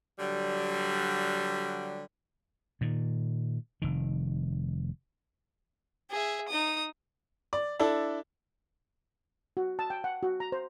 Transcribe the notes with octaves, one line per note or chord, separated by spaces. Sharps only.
D3 F#3 G3
A#2 D#3
F1 D#3
G#4 E5
D#4 D#6
D5
D4 E4 A4
F#4
A5
G5
F#5
F#4
A#5
C5